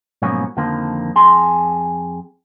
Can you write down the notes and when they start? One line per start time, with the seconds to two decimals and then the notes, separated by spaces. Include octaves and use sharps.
0.22 G#2 B2 F3 F#3 A#3 C#4
0.57 F2 D3 D#3 F3 A#3
1.16 F2 G#4 C6